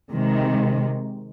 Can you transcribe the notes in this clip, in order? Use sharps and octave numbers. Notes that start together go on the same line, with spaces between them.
C3 D#3 G#3